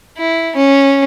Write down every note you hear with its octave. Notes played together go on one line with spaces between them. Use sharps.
E4
C#4